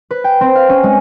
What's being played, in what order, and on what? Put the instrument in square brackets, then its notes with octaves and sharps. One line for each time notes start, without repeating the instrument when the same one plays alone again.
[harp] B4
G5
C4
F5
C#4
G#3